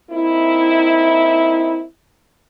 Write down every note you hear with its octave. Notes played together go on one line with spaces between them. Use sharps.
A#3 C4 D#4 E4